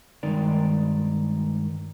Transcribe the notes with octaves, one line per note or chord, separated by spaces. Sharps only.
G2 D#3 G#3 D#4 D5